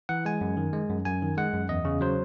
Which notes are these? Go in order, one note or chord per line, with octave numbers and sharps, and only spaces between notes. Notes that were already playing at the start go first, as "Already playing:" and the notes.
E3 F#5
G#3 G#5
F#2
D#3
G#3
F#2
F#2 G#5
D#3
G#3 F#5
F#2
E2 D#5
C#3
F#3 C5